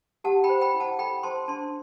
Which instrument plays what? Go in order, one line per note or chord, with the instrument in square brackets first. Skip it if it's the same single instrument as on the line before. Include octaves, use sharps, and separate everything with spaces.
[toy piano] G4 F#5 A5
G5 B5
C5
G5 B5
E4
F#5 A5
A4 G5 B5
C5 A5 C6
D4 A5 C6